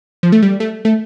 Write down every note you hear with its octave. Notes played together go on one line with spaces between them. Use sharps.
F3
A3
G3
A3
A3